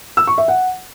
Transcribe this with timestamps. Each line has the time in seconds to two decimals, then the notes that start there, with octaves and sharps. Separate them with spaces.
0.17 E6
0.27 C#6
0.38 E5
0.48 F#5